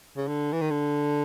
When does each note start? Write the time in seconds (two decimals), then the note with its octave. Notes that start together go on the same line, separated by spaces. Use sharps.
0.16 C#3
0.27 D3
0.52 E3
0.61 D#3
0.70 D3